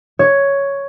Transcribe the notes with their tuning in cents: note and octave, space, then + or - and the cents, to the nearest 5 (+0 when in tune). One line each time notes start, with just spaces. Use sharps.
C#5 +5